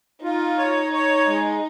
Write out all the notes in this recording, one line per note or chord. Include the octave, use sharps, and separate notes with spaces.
D#4 F4
C#5
C#5
G#3